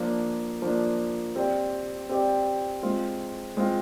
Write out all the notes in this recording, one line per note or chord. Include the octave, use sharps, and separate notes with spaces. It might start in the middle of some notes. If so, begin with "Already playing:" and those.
Already playing: F3 A#3 D4
F3 A#3 D4
C4 G4 D5
C4 G4 D5
G#3 C4 F4
G#3 C4 F4